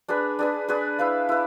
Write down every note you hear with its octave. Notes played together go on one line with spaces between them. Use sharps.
D4 G#4 B4
D4 G#4 B4
D4 G#4 B4
E4 B4 F5
E4 B4